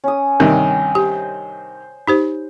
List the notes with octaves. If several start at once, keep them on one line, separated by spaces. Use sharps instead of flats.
C#4 D#6
G2 C3 D#3
G4 C5
D#4 G4 C5